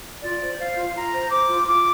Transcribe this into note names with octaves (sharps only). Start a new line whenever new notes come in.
F4 D5
C5
C5 F5
F4
F4 A#5
C5
C5 D6
F4
F4 D6